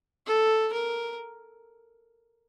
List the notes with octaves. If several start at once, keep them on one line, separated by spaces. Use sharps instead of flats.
A4
A#4